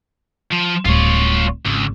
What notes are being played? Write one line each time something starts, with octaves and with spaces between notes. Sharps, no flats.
F3
D1 G3 F4 C#5
G#1 C#2